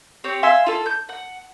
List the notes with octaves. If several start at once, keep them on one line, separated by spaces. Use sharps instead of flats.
C4 G4 C#5
E5 F5 G#5 C6
F4 A4
G6
F#5